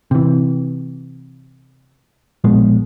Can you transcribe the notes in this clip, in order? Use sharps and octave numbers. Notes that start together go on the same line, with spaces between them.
C3 E3
A#1 B2 G#3